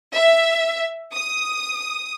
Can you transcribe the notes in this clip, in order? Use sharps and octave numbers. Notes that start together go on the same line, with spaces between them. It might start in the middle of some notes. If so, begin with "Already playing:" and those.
E5
D#6